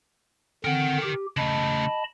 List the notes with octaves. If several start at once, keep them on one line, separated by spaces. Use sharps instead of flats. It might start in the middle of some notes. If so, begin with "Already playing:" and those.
D3 C4 A#4 F#5 G5
G4
C#3 A3 D#5 A5 B5